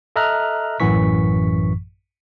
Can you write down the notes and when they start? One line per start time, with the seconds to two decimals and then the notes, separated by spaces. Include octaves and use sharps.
0.16 A4 D#5 E5 A#5 F6 F#6
0.80 A1 F#2 A2 E3 C#6 B6